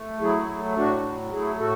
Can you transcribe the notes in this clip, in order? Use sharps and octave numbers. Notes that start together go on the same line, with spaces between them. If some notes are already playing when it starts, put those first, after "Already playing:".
Already playing: A3
F#3 E4 G#4
A3
A2 D4 F#4
F#3
A3 E4 G#4
A2 F#4 A4